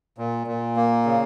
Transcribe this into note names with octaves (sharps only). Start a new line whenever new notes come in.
A#2
A#2
A#3
C#3